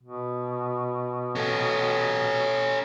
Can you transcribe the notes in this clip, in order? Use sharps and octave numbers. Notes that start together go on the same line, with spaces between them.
B2
C#4 A4